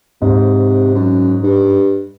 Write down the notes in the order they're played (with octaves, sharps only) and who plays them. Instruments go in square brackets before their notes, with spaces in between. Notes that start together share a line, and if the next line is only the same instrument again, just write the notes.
[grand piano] G#2 [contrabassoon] C3
[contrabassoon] F#2
G2